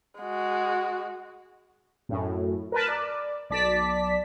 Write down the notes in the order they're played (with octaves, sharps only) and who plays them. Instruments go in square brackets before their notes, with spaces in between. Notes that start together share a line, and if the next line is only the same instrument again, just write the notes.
[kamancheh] G#3 F#4
[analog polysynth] F#2 A2
A#4 B4 A5
D5
B1 D5 A5 B6